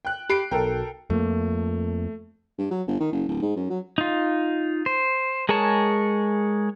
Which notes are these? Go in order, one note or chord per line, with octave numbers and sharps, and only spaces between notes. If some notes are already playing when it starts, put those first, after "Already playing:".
G5 F#6
G4 B5 C7 D7
B1 A4 A#4 G5
F2 A3 A#3
G2
F#3
G1
D#3
F#1
D1
G#2
F#2
F#3
D#4 F4
C5
G#3 G#4 A#4 C#5 A5